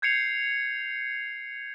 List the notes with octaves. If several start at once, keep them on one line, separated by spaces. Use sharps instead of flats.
G6 G#6 C7 C#7 F7